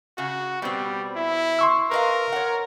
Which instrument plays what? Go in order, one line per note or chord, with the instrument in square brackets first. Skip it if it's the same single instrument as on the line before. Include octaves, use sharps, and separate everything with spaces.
[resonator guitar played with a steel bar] C#3 [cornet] F#4
[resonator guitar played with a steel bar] B2 C4 [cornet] G3
[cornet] E4
[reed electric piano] C6 C#6 E6
[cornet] A#4 [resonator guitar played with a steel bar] B4 D#5 F5
[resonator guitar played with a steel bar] C#5 F#5